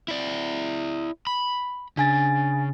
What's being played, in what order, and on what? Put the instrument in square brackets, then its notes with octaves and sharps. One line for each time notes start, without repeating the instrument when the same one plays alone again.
[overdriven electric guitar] E4 D5
B5
[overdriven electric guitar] C#3 [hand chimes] D4 G#5 A6